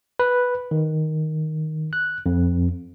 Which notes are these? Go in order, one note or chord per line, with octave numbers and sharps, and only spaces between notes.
B4
D#3
F#6
F2